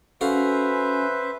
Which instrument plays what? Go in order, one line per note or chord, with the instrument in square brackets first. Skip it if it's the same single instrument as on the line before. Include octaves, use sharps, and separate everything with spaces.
[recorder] C#4 [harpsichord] F#4 A4 F5 [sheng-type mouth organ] B4 C5 E5